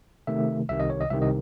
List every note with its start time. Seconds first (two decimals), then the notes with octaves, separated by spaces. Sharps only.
0.27 C3 D#3 A3 E5
0.69 C2 C3 D#3 E5
0.80 D#5
0.90 C#5
1.01 D#5
1.10 C2 C3 D#3 E5
1.22 D#5